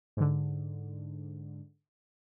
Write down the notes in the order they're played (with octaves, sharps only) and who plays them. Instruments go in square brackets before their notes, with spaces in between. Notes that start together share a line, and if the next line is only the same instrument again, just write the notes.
[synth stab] G#2 D3